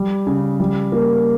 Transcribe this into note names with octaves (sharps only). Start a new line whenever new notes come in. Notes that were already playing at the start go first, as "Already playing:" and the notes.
Already playing: G3
C#3
G3
A#3